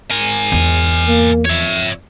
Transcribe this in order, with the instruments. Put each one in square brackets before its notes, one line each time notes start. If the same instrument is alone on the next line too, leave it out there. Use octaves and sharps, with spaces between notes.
[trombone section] G#2 [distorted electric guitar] A#4 G#5
[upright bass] E2
[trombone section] A#3
[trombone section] F2 [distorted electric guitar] C#5 E5